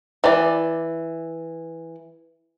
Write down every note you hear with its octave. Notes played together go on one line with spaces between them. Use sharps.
E3 D5